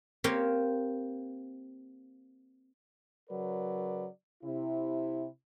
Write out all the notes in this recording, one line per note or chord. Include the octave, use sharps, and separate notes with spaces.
A#3 C4 G4 C#5 F5 G5
C#3 F#3 A#4 B4 D5
C3 E4